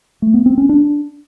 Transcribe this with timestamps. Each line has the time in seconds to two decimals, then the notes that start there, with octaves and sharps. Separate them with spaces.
0.22 A3
0.34 B3
0.46 C4
0.58 C#4
0.69 D4